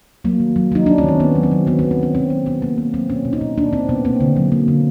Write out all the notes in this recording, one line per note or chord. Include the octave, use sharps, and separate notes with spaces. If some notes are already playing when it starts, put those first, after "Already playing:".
F#3 A#3
D#3
F#3
F#3 D#4
F#3 D4
C#4
D#3 C4
D#3 B3
F#3
C4
F#3
D#3 B3
B3
D#3
C4
D#3 C#4
B2 C4
F#3 B3
B2 B3
B2 A#3
B2 B3
F#3 C4
B2 C#4
B2
D#4
B2
A#3 D4
B2 C4
B2 B3
A#3 C4
D3
F#3
A#3
D3